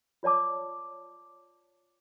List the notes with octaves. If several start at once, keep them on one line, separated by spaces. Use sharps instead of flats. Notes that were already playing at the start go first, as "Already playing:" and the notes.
F4 C#5 D5 A5 D6